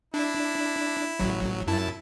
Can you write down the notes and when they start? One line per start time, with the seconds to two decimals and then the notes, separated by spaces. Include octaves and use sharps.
0.14 D4 E4
1.20 A1 F#3
1.67 F#2 E4 A5